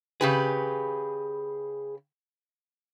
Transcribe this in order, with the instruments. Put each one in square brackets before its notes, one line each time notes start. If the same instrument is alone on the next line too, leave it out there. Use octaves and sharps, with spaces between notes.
[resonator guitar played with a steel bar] C#3 G4 B4 [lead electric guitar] G#4 B5